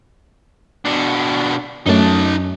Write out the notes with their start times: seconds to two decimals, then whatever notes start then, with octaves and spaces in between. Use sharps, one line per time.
0.85 B2 D4
1.86 F#2 A3 D#4 A5